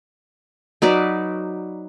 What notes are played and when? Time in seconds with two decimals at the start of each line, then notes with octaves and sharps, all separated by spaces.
0.82 F#3 D#4 B4 D5